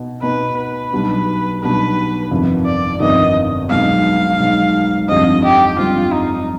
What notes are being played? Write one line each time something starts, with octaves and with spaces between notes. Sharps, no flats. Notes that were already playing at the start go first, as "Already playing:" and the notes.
Already playing: B2 D#4
B2 B3 D#4 B4
B4
B1 B2 G3 D4
B1 B2 G3 D4 B4
G1 F2 C3 D#3 B3
D5
G1 F2 C3 D#3 B3 D#5
B1 B2 G#3 F5
B1 B2 G#3
G1 F2 D3 G3 C4 D#5
G4
G1 F2 D3 G3 C4 F4
D#4